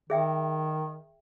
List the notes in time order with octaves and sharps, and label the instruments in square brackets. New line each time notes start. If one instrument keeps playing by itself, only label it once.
[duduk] D#3 [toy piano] G#4 E5 G5